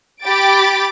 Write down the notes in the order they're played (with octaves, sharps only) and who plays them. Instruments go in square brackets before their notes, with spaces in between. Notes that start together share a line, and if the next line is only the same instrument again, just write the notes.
[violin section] G4 G5 B5 D6 A6 D7